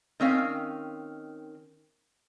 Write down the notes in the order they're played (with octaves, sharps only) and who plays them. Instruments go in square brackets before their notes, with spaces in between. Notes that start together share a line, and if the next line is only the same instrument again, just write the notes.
[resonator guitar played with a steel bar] D#3 C4 C#4 F5